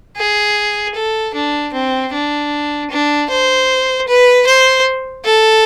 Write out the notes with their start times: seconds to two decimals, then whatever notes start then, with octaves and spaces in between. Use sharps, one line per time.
0.17 G#4
0.95 A4
1.34 D4
1.73 C4
2.13 D4
2.90 D4
3.30 C5
4.08 B4
4.47 C5
5.25 A4